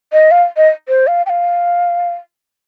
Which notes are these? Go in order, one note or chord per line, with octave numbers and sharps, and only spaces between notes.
D#5
F5
D#5
C5
F5
G5
F5